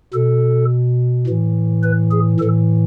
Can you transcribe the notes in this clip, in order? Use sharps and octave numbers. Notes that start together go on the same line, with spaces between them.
B2 A4
A2 E3
B4
G#4
A2 E3 A4